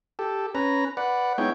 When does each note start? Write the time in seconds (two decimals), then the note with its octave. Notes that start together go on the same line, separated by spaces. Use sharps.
0.19 G4 A4
0.55 C#4 B4 A#5
0.97 B4 D5 F#5
1.38 G#3 B3 D#4 E4 C#5 G5